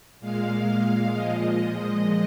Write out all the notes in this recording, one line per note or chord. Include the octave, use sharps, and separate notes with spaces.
A#2 G#3 F5
F5
A#2 F3 G#3 D#5